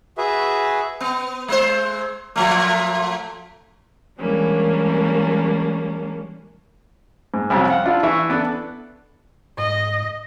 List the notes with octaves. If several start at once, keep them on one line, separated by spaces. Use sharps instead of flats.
F#4 G#4 B4 E5
B3
G#3 C5
A#2 F3 A3
E3 G3 G#3 A#3 C#4 D4
G#2
C2 F2 F#3
F5 F#5
D4 E4 F4
E3 E5 C#6
B3 D4 A4
G#2 D#5